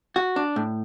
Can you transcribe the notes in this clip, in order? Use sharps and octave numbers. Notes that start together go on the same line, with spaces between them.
F#4
D4
A2